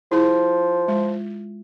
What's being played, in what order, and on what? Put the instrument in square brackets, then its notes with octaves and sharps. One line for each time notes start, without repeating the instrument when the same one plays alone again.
[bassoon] F3 [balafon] E4 G#4 C5
[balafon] G#3 F4